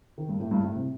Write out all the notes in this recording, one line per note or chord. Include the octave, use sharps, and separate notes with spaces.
D#3
G2
A2
G2
A2
C3